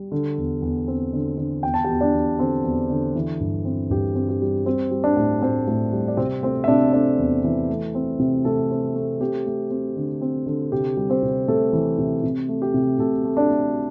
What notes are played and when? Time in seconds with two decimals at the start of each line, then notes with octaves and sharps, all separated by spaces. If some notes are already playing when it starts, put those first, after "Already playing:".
Already playing: G3
0.12 D3
0.38 E2
0.62 E2
0.88 C4
1.13 D3
1.38 D3
1.63 E2 G5
1.74 A5
1.84 G4 G5
1.89 E2
2.01 D4 D5
2.14 E2
2.39 D3 C4 C5
2.64 E2
2.90 D3
3.15 E3
3.40 G2
3.65 C4
3.90 G2 G4
4.15 C4
4.29 G4
4.42 G3
4.66 G3 C4 C5
4.91 G3
5.04 D4 D5
5.17 A2
5.41 A2 C4 C5
5.68 A2
5.93 G3
6.08 D5
6.17 C3 C4 C5
6.43 A3 C4 C5
6.64 E5
6.68 C3 D4 D5
6.93 A3 D4 D5
7.18 E2
7.44 E3
7.70 A3
7.95 C4
8.20 C3
8.45 C3 A3 A4
8.71 C4
8.95 A3
9.20 C4 G4
9.46 A3
9.71 C4
9.96 D3
10.22 C4
10.46 D3
10.72 C3 G4
10.97 G3
11.10 C4 C5
11.23 C3
11.48 C3 A3 A4
11.73 E3
11.99 C3
12.23 C3
12.49 A3
12.62 G4
12.74 C3
12.99 C3 A3 A4
13.25 A3
13.37 D4 D5
13.49 A3